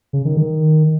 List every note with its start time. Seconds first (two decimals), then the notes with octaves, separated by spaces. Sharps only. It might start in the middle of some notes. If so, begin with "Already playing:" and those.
0.13 C#3
0.25 D#3
0.37 D#3